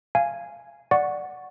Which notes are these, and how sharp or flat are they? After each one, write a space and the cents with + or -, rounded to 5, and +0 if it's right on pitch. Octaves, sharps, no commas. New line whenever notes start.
F5 -15 G#5 +0
D5 +0 F#5 -5 C#6 +0